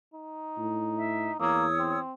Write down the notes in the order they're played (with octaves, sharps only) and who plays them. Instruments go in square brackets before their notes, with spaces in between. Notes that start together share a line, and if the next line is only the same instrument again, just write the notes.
[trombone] D#4
[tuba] A2
[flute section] E5
[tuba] E2 [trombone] A#3 [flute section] C#5 D#6 E6
[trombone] C4